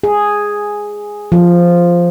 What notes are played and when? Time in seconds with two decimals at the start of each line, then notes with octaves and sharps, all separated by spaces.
0.03 G#4
1.32 F3